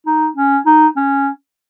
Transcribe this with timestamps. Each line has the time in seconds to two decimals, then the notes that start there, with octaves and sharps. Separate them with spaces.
0.06 D#4
0.36 C#4
0.66 D#4
0.97 C#4